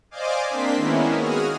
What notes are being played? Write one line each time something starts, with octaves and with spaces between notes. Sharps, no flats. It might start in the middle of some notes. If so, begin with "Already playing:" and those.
C5 D5 D#5 F5 G#5 D6
A#3 C4 D4 C6 B6
D#3 G#3 A#3 B3 C#4 E4
F#4 G#4 D#6 F6